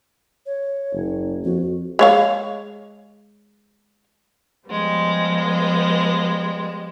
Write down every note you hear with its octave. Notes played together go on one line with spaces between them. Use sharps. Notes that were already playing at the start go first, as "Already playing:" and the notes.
C#5
F#1
F2 F#4
G#3 C#5 F5
F3 G3 G#3 B3